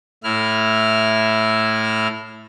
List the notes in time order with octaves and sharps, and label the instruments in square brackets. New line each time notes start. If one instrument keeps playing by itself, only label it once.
[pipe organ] A2 E4 F6